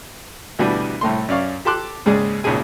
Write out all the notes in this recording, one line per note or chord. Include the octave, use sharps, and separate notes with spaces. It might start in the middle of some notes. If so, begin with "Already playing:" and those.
D2 B2 E3 G3 B3 D4
C2 A2 A3 C6
F#2 C#4 D5 F5 C#6
G4 A4 A5 C6 D6 F#6
D#2 G#2 C#3 G#3 G#4 D5
G#1 D#2 A#2 C#3 G#4 G#5